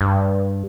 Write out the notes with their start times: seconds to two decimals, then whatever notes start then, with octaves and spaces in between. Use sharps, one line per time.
0.01 G2